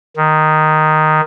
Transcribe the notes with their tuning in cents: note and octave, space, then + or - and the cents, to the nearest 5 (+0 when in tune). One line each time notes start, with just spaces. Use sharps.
D#3 -5